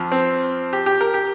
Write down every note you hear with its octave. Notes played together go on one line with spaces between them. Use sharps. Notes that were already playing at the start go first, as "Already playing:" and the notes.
Already playing: F2 F3
C4
G4
G4
A#4
G4